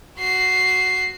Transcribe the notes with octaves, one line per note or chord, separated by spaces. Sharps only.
F#4 C7